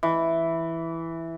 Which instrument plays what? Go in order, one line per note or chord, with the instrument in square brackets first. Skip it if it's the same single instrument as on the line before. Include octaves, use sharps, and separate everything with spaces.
[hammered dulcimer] E3